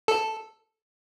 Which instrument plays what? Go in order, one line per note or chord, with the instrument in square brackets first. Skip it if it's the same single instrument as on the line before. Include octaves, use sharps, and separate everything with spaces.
[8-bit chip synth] A4